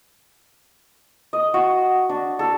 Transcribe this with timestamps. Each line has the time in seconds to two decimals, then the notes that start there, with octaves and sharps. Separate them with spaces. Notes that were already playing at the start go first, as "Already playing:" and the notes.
1.33 D#5
1.54 F#4
2.09 D4
2.39 A4